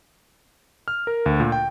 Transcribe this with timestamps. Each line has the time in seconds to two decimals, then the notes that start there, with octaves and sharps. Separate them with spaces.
0.88 F6
1.07 A#4
1.26 D2
1.40 A#2
1.52 G5